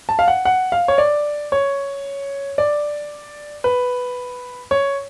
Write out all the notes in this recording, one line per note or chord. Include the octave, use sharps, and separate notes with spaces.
A5
F5
F#5
F#5
F5
C#5
D5
C#5
D5
B4
C#5